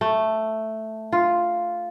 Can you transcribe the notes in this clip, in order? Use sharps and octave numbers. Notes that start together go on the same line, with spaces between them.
A3
F4